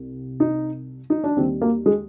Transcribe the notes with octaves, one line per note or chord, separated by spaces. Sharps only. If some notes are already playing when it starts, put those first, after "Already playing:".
Already playing: C2 C3 G3
D#4
D#4
D4
D#2 D#3 G3 C4
A#3
G#3